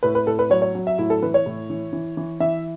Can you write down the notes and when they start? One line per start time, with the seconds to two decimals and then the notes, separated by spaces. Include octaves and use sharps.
0.03 A2 B4
0.15 B4
0.26 A2 A4
0.39 B4
0.50 F#3 C#5
0.62 C#5
0.75 F#3
0.87 E5
0.98 A2 E4
1.10 A4
1.22 E3 B4
1.34 C#5
1.46 A2
1.70 E3
1.93 E3
2.17 E3
2.40 E3 E5